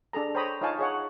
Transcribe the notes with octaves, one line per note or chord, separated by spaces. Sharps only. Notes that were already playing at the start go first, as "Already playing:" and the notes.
D4 G#4 A4 A#5
C5 C#5 G5 A#5 B5 D#6
D#4 F4 C#5 F5 G#5 A5
G#4 C#5 F#5